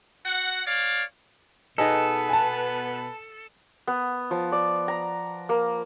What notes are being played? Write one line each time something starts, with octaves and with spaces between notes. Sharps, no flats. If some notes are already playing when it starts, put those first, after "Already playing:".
F#4 F#5
C#5 D5 F5
B2 B3 D#4 G#4 A4 B4 D#5
G#5 A5
B3
F3
D5
A#5
A#3